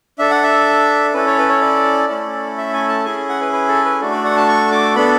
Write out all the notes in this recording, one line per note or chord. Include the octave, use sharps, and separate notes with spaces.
D4 A4 E5
F#5
E5
C#4 E4 A4 B4
C#5
B4
C#5
D5
A3 C#4 E4 A4
E5
G#5
A5
C#4 E4 G#4 G#5
F#5
B4
B4
A4
B4
A3 D4 F#4 A4
D5
F#5
A5
C#6
D6
B3 D4 A4 B5